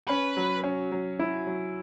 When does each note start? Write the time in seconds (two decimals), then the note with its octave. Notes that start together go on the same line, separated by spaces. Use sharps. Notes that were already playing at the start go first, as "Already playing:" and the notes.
0.09 C#4 B4
0.37 F#3
0.64 C#4
0.92 F#3
1.19 E4
1.47 F#3